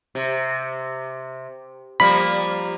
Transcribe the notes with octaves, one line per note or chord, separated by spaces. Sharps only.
C3
F3 G3 A#3 B5